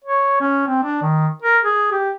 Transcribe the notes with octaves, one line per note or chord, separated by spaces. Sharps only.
C#5
C#4
C4
D4
D#3
A#4
G#4
G4